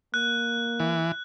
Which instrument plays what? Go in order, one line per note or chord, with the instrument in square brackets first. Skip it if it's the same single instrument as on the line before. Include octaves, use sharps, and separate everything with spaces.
[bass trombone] A#3 [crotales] F#6
[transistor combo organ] E3